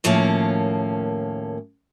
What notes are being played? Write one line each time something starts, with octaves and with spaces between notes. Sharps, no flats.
D#2 A2 F3 A#3 C#4